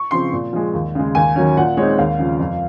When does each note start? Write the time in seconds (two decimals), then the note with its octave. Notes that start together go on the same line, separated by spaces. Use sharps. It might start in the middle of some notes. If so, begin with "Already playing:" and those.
Already playing: C#6
0.11 C#3 F3 C4 C6
0.33 A#2
0.53 F3 G#3
0.74 D#2
0.95 C#3 G#3
1.15 D#2 G#5
1.36 D#3 F#3 C#4
1.57 A#2 F#5
1.77 G#3 C4 D#4 C#5
1.99 D#2 F5
2.19 C#3 F3
2.40 F2